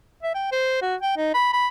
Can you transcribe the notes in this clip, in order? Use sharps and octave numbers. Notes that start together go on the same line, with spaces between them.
E5
G5
C5
F#4
G5
D#4
B5
B5